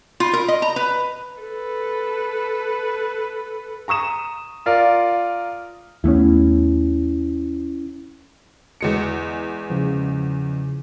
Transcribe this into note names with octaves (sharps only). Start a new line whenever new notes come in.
F4
A#4
D#5
A#5
B4
A4 B4
A#5 C#6 D#6 E7
F4 A#4 D5 F5
D#2 A3 B3 C#4 E4
E2 G#3 C#7
C#3 F3